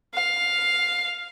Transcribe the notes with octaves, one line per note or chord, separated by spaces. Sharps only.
F5